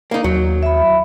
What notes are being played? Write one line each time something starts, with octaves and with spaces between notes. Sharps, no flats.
A#3 D#4
D#2 F#3
E5 B5